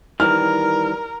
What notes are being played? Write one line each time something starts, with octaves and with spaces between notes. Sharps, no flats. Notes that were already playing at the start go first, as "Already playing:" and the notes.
D#3 E3 G3 A#4 F6